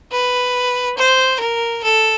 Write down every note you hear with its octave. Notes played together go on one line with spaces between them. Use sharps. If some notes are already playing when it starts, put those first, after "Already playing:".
B4
C5
A#4
A4